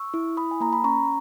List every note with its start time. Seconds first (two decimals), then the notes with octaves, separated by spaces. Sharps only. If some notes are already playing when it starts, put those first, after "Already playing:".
Already playing: C#6 E6
0.14 E4
0.37 E4 B5 D#6
0.51 G#5
0.60 A#3 A#5
0.73 B5
0.84 C#4 A#5 C#6